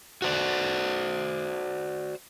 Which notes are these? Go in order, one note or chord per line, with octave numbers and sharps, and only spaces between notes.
F#4 C5 D5